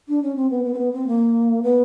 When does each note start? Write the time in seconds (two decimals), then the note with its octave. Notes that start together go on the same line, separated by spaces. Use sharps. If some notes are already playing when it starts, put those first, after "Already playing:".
0.08 D4
0.23 C#4
0.36 C4
0.50 B3
0.64 B3
0.73 C4
0.78 B3
0.92 C4
1.07 A#3
1.63 B3